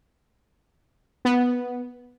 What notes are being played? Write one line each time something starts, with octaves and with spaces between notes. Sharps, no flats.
B3